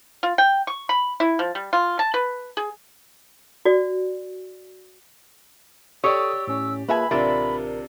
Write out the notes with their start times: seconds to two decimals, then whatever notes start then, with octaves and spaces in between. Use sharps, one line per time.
0.23 F4
0.38 G5
0.67 C#6
0.89 B5
1.20 E4
1.39 F3
1.55 G3
1.73 F4
1.99 A5
2.14 B4
2.57 G#4
3.65 F#4 D5
6.04 G4 A4 C#5 D5 C#6 D#6 E6
6.47 A2 C#4 E6
6.89 A#3 F4 G#4 B4 E5 G#5 B5
7.11 A1 C3 D4 F4 A#4 D5 E5